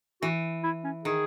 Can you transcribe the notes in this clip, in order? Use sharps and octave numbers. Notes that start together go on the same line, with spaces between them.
E3 F#4
E4
C#4
D#3 G#4